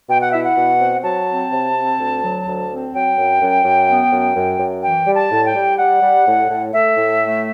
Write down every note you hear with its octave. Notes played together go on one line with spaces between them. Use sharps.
B2 G5
F#5
E4 E5
F#5
B2
C4
F#3 A5
C4
C3
C4
D2
F#3
D2
C4
F#3 G5
F#2
F#2
F#2
B3
F#2
F#2
F#2
E3 G5
G3
A5
A2
G5
G3
G3 F#5
G3
A2
A2
A3 E5
A2
A3